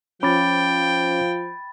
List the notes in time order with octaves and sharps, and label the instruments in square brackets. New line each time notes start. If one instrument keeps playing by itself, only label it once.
[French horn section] F3 [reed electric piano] C#4 D6 [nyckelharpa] G5 [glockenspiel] B5 A6